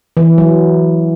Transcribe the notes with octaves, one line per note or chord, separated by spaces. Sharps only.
E3
F#3